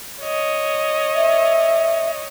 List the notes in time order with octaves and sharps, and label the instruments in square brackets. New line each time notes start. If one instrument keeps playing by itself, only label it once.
[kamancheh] C#5 D#5
[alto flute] E5